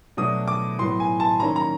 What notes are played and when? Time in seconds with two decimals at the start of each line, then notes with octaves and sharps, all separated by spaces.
0.17 B2 F#3 A3 D4 D#6
0.48 D6
0.78 A2 F#3 B3 C6
1.00 G#5
1.20 A5
1.40 D#3 F#3 A#3 C#4 A#5
1.56 A#5